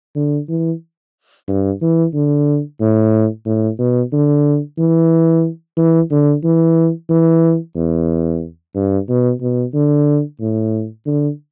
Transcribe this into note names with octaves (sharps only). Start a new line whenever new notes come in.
D3
E3
G2
E3
D3
A2
A2
B2
D3
E3
E3
D3
E3
E3
E2
G2
B2
B2
D3
A2
D3